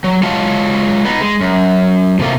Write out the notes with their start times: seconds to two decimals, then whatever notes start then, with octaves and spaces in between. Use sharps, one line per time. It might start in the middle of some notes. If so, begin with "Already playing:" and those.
0.04 F#3
0.23 G#3 F4 F#4 C#5 F5 A5
1.05 B3 D#4
1.21 G#3
1.41 F#2
2.19 A2 C3 A#3 F4